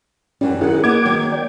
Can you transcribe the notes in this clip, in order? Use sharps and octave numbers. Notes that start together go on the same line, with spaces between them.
F#2 E3 G3 C#4
D#3 F#3 E4 G#4 F#5
A#3 B3 B4 D#5 D6 G#6
D#3 F#3 C#5
D5 G5